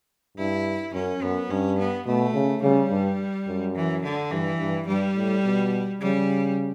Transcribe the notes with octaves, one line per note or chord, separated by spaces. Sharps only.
G2 E4
F#2 C#4
F#2 B3
G2 C#4
B3
B2 A3
C#3
C#3 G3
G2
F#2
E3
D3
G2 E3
G2
G2 G3
A2
B2
C#3 G3